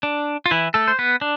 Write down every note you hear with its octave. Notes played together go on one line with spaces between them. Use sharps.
D4
F4
E3 E4
A3 A4
C5
B3 B4
D4